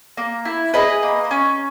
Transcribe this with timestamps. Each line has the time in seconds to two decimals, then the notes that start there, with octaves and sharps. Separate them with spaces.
0.17 A#3
0.45 E4
0.74 G#4 B4 D#5
1.03 A#3
1.31 C#4